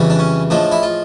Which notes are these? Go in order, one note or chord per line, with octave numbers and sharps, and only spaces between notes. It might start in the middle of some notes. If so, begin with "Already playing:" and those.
Already playing: F2 C#3 E3 G3
D4
C#4
A2 F3 G#3 D4
E4
F4